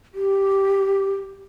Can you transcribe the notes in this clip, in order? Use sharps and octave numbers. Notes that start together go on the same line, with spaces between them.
G4